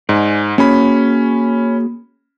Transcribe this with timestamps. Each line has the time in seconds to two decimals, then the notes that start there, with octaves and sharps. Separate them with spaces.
0.09 G#2 D5 G#5
0.58 A#3 C#4 F#4 G#4 B5